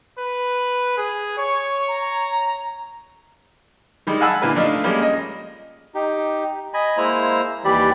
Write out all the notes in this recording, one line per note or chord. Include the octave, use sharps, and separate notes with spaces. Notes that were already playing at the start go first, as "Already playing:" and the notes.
B4
G#4
C#5 C#6
A#5
D#3 G3 G#3
F5 F#5 G#5 A5 B5 E6
A#2 D3 A#3 E4 B4
F3 A3 D4 D#4 F4
F3 G3 G#3 A#3 C#4
D#5
D#4 G4
D#5 G#5 B5
G#3 A#3 E4 C5 A#5
D#2 E3 G3 G4 D5 B5